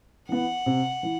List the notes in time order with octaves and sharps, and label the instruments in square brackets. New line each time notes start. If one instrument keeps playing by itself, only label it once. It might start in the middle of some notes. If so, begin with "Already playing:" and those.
[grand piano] E3 B3 [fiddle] F#5
[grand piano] C3
E3